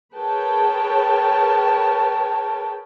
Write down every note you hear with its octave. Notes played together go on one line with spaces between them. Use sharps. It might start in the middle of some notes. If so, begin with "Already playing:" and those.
G#4 A#4 B4 C#5 G5 A5